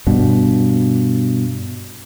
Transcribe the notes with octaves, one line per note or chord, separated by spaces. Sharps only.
G2 B2